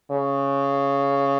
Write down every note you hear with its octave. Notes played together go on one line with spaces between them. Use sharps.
C#3